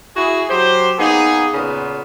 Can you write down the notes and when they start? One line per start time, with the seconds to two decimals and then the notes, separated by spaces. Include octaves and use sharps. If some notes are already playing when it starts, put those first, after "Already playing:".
0.15 E4 F#4 G#4
0.50 F#3 G4 C5
0.99 A#3 B3 D#4 G#4
1.54 A#2 C#3 B3